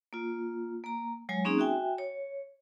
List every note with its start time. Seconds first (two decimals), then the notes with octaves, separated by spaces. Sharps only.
0.13 A#3 F4
0.84 A#3 A#5
1.29 F#3 G#3 C#5 G#5
1.45 A#3 C4 C#4 D#4 G#4
1.58 F#4 E5 G5 G#5
1.98 C#5